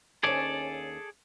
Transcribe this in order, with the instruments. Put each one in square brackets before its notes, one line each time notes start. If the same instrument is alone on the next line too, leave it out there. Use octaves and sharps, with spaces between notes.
[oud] D#2 C#4 [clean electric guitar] G#4 A4 D5